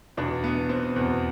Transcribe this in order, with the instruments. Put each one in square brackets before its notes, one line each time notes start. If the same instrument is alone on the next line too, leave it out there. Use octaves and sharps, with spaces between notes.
[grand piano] E2 B2 D4
B3
C4
E2 B2